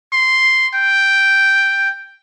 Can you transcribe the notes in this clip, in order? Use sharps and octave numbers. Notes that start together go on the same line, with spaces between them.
C6
G5